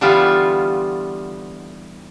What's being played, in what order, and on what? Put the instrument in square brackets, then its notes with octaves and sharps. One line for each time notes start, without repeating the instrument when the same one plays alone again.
[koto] D3 E3 G3 B3 F4